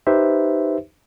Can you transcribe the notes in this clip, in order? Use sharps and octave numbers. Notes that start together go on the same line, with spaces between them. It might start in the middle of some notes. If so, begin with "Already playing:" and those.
D#4 G4 B4 C5 E5